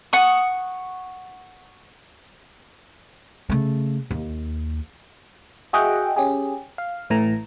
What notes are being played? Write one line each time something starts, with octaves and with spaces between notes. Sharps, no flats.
F#5 C#6 D#6
C#3 A3
D#2
F#4 G#4 D#5 E5 F#5 G5
C#4 G4 G#4
F5
A1 A2 E3 A#5